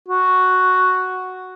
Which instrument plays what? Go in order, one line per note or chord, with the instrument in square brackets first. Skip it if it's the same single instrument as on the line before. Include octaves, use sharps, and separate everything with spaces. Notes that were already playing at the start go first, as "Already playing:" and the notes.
[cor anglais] F#4